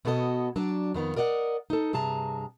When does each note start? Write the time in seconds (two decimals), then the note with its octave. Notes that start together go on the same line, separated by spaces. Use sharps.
0.05 B2 B3 F#4 A4 A#4 D#5
0.56 F#3 D4 D5
0.94 F2 D#3 B3 D#4
1.16 A#4 D5 D#5 F5 F#5
1.70 D#4 A4
1.93 G2 C3 G#4 A5 A#5